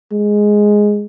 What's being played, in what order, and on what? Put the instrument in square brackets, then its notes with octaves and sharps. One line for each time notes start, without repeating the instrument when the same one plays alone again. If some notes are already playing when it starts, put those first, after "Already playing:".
[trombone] G#3